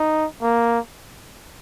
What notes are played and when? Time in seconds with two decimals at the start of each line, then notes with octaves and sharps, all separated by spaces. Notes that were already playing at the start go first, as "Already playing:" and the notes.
Already playing: D#4
0.42 A#3